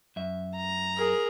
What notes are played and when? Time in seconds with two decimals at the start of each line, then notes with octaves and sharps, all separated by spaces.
0.16 F#2 E5
0.57 A#5
0.96 G#4 A#4